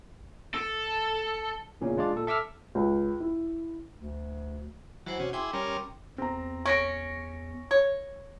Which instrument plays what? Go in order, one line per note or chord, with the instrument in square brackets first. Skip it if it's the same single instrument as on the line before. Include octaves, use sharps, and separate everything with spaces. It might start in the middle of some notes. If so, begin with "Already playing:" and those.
[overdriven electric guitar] A4
[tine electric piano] E2 A#2 C#3 C#4
G#3 D4 F4 G#4 D5
A#2 A4
A4 E5 D6 E6 F6
[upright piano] C#2
E4
[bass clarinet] D2
[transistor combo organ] E3 F#3 [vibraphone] F#4 C5 F#5
[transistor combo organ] C3 C#4
[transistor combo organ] E4 G#4 [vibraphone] G5 C6 D6
[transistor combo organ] G3 C#4 A#4
[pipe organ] E2 [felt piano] C4 A#5
[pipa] C#4 [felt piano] C#6 A#6 D7
[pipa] C#5